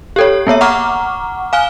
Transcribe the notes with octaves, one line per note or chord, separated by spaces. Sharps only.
G4 A4 C#5
A#3 B3 C#5 E5
F#5 A#5 C#6 D6 F6
F5 G#5 F6 G7